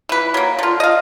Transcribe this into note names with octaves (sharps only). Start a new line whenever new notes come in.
E3 B4
F#3 A#3
D3 F4
D#5 F5